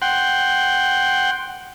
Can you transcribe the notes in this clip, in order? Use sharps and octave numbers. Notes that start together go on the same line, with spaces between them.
F#5 G5 C6